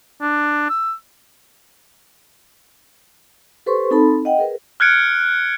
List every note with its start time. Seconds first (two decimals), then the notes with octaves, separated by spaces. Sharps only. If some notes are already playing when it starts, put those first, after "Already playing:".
0.22 D4
0.70 E6
3.66 G4 A4 B4 C5 C6 C#6
3.91 C4 D#4 A4 A5 B5
4.25 D#5 F#5 G5
4.38 G#4 A#4 B4
4.80 F6 F#6 G#6 C#7 D7